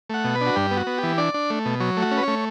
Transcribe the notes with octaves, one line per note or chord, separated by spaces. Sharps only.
A3 F#5
B2
B4
D4
F#4
G2 G4
B3
F#4
B3
E3 G4
D4 D5
D4
A3
B2
F#3 C#5
A3
F#4
C#4
B4
A3 C#5